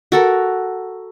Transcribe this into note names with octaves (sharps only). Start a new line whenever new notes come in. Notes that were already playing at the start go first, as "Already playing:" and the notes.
F#4 A4 A#4